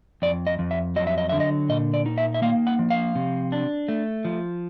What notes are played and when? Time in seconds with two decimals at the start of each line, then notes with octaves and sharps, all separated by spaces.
0.22 F2 D5
0.47 D#5
0.59 F2
0.71 E5
0.96 F#3 D#5
1.07 E5
1.18 D#5
1.29 D3 E5
1.40 D#5
1.69 A#2 D#5
1.94 D5
2.06 D#4
2.18 E5
2.34 E5
2.42 A#3 F5
2.67 F#5
2.79 F3
2.90 F5
3.15 C3
3.52 D4
3.88 A3
4.25 F3